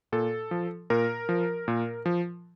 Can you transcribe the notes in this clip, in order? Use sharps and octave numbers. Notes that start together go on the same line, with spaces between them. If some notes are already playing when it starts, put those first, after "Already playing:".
A#2 A4
F3
A#2 A#4
F3
A#2
F3